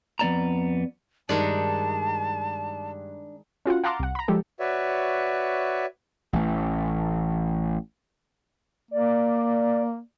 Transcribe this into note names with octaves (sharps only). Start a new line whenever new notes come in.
F2 B3 C4 D5 A5 A#5
G2 D#3 G#3 D4 D#4 A5
C#4 F4 F#4 F#5
F5 F#5 A5 A#5 C6 D6
C2 F#5
A#5 B5
F3 G#3 G4 A4
F#4 B4 C#5 D5 E5
A1 E3 A3
A#3 D5